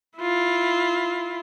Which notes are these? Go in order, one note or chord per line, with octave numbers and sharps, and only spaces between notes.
E4 F4